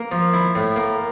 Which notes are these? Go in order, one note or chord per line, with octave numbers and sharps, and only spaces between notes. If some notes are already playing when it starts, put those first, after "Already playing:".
Already playing: A#3
F3
E4
A2
A#3